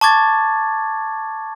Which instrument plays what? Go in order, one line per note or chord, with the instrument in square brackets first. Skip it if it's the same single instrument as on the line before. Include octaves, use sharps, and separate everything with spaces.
[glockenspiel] A5 C#6 D6 G#6 A6